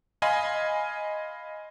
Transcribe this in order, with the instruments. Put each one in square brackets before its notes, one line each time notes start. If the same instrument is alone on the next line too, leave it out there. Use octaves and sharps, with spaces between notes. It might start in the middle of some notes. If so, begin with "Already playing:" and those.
[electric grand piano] D#5 F5 G#5 B5 C6